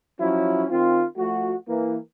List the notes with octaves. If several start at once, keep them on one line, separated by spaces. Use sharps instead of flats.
F3 F#3 C#4 E4
D#3 C4 F4
F3 A3 F#4
E3 A#3